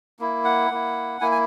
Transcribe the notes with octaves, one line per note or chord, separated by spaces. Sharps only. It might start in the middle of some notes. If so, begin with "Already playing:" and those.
A#3 E4
F#5
A#3 E4
A#3 E4 G#5
G#5